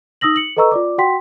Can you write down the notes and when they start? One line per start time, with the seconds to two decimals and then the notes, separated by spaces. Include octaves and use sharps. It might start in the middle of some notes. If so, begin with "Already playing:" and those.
0.21 D#4 D#6 E6 A#6 F#7
0.36 C#7 F#7
0.57 A4 B4 D#5 A#5 C#6 E6
0.71 F4 D5 D6
0.98 F#4 F#5 G5 C6 B6